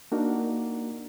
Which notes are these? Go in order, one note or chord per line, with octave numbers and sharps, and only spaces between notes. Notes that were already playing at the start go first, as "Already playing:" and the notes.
A#3 D4 D#4 F#4 A#4